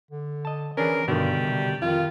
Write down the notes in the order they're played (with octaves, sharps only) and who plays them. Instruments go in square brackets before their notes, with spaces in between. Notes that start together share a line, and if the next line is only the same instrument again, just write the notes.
[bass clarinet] D3
[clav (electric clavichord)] D#5 A5
[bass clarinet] E3 [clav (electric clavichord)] C#4 D4 G#4 [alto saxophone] A#4
[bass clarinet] G2 [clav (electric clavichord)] B2 D3 D#3 [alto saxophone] G3
[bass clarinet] C3
[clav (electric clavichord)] F2 [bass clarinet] D#3 [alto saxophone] F4